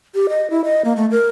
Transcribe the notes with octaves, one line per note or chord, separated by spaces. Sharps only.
G4
D#5
E4
D#5
A#3
A3
A#4